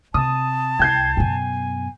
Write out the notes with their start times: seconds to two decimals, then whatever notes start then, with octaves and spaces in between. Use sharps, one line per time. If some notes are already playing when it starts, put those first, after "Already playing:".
0.14 C3 A5 D#6
0.79 C2 G5 G6 G#6 C7
1.17 F#2 B2 G#5